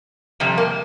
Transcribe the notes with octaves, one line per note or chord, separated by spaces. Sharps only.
F2 C3 G3
A#3